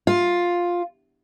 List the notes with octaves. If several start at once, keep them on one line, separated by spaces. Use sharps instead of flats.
F4